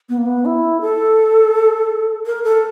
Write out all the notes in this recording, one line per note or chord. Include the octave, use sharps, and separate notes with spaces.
B3
A#3
B3
E4
A4
A#4
A4